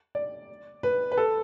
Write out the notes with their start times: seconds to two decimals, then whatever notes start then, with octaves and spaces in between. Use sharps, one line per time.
0.15 D5
0.83 B4
1.12 B4
1.17 A4